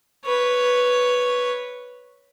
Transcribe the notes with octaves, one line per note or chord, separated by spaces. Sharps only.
B4 C#5